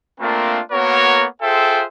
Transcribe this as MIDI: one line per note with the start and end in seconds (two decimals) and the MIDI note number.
0.20 0.60 57
0.20 0.60 58
0.20 0.60 60
0.20 0.60 62
0.20 0.60 65
0.20 0.60 70
0.72 1.25 58
0.72 1.25 59
0.72 1.25 66
0.72 1.25 70
0.72 1.25 73
1.42 1.83 65
1.42 1.83 68
1.42 1.83 69
1.42 1.83 72
1.42 1.83 76
1.42 1.83 79